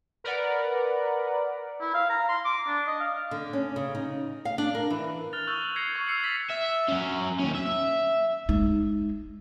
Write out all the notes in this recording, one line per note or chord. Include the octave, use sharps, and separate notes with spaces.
A#4 B4 D5 F#5
E4
F5
A#5
C6
D6
D4
D#5
F5
D3
C#4
C#3
D#4
F5
D4
A#4
E3
F6 F#6 A6 F7
C#6 D#6 E6 F#6 G6 F#7
G#6 A#6 C7 C#7
C#6 F#6
E6 C7 C#7 F7 F#7
F#6 A6 B6
E5
F#3 C#4
D#2 C#4
E5
G#3 D#4